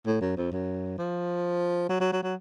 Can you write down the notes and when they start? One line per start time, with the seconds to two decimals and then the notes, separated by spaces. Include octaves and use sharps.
0.06 A2
0.21 F#2
0.37 F2
0.52 F#2
0.98 F3
1.89 F#3
2.00 F#3
2.12 F#3
2.23 F#3